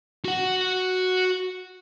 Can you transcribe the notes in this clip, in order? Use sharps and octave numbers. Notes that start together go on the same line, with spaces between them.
F#4 F#5